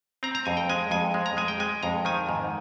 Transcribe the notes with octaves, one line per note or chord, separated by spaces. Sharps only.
C4 A#5
A#5
F2 G#5
G5
G#3 G#5
F2 G#5
G#3
A#5
G#3 G#5
G5
G#3 G#5
F2 A#5
D#3 G#5
G#2